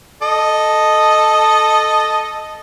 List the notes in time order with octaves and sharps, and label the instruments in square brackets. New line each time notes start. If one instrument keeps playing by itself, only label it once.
[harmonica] A4 D#5